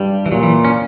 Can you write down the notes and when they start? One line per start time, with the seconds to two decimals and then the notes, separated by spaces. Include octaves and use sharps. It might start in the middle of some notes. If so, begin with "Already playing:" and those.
Already playing: G2 G3
0.26 E3
0.32 A#2 F#3
0.43 E3
0.65 C#4